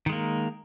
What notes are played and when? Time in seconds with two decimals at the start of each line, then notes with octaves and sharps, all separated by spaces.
0.06 D#3
0.09 G#3
0.12 A#3